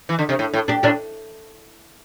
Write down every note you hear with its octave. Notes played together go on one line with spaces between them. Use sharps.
E3
D3
C3
A2
A2
D4 G4
A2 D4 G4